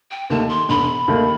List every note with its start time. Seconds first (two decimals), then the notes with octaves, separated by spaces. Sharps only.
0.11 G5
0.30 D#2 D#3 A3 A5
0.49 C6
0.69 E1 B5
1.08 D#2 D#3 A3